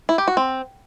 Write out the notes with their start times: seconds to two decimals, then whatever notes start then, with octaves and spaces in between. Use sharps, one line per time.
0.09 E4
0.18 G4
0.28 F#4
0.37 C4